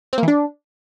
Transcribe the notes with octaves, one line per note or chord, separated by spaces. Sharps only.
C4
A#3
E3
D4